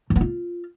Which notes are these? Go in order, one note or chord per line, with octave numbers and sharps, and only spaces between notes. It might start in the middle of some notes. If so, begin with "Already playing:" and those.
F3
B3
F4